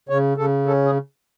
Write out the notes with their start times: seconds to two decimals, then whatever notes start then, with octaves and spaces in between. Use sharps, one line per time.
0.09 C#3 C#5
0.37 C#3 A4
0.66 C#4 A4
0.85 G#4